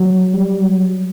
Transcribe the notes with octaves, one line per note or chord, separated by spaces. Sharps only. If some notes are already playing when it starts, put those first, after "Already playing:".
Already playing: F#3
G3
F#3